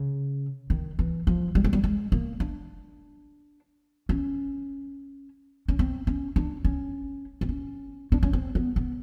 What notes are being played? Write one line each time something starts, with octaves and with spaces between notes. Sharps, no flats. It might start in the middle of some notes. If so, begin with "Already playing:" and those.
Already playing: C#3
D#3
E3
F3
G3
G#3
G3
G#3
A#3
D4
C#4
C#4
C4
C#4
D4
C#4
C4
C#4
D4
C#4
C4
B3
B3